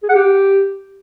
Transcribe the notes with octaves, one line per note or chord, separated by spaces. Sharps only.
G#4
F#5
G4